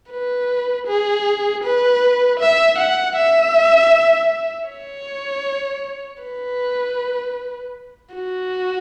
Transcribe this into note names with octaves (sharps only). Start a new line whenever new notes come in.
B4
G#4
B4
E5
F#5
E5
C#5
B4
F#4